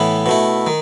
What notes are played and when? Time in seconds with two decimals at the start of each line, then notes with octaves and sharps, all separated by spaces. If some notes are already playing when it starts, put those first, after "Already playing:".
Already playing: A2 E3 B3 E4
0.26 B2 A3 E4
0.67 D#3